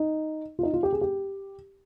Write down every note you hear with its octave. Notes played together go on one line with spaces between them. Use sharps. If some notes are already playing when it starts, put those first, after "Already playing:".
Already playing: D#4
F4
D#4
F4
G4
G#4
G4